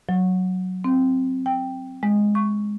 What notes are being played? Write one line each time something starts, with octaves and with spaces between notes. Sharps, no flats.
F#3
C4
G5
G#3
C#6